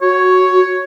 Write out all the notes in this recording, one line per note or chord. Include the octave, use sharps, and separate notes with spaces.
F#4 C#5